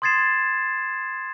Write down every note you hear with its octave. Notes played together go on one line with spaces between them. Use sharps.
C6 D#6 G#6 A6 C7 E7